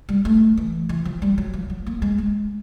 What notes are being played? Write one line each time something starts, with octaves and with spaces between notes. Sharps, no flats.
G3
A3
E3
E3
F3
G3
F#3
F3
F#3
A#3
G#3
G#3